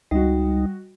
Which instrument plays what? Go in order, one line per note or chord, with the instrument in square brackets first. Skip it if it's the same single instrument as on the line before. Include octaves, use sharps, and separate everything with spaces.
[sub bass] C#2 [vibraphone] G3 [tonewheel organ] D#4 [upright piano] F#4 D#5